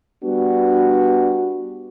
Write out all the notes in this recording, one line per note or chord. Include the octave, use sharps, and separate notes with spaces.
G3 B3 D4 F#4